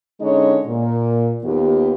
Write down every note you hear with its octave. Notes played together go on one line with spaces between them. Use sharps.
D3 G#3 C#4 D#4 C#5 D#5
A#2
D#2 D#3 B3 F4 G4